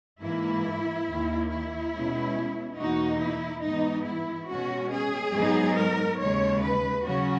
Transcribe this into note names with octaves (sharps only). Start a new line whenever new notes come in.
G#2 E3 A#3 E4
D#2 D#3 A#3
E4
B2 G#3 C#4
E2 B2 A#3 D#4 F#4
E4
G#2 E3 B3 D#4
E4
B2 G#3 C#4 F#4
G#4
G#2 F#3 B3 D#4
A#4
D#2 C#3 G#3 C#5
B4
C#3 F#3 C#4 F#4